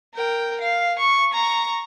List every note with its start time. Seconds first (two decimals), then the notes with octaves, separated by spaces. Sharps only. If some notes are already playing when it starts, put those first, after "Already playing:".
0.14 A#4 G5
0.61 F5
0.99 C#6
1.34 A#5 C#6